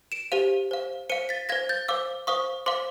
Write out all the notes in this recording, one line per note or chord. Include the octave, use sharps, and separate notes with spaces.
D7 E7
G4 C5 F5 D#7 F7
C5 F5
C5 F5 C#7 D#7
A6 B6
C5 F5 G#6 A#6
G6 A6
C5 F5 D6 E6
C5 F5 C#6 D#6
C5 F5 C6 D6